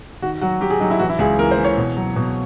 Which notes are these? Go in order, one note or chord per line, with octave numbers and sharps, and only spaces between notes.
D#3 F#4
F#3 F#4
F#3 G4
G#4
F#3 D#4
E4
E3 F#4
E4
C#2 G#4
E3 A#4
C5
E3
C#5
B2
F#3
B2